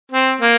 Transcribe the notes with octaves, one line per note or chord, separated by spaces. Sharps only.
C4
A#3